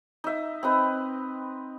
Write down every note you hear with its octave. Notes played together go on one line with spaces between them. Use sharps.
D#4 E5
C4 D#4 B4